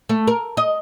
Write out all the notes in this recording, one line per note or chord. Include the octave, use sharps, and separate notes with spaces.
A3
A#4
D#5